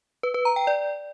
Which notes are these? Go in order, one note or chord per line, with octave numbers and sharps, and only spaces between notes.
B4
B4
A#5
G5
D5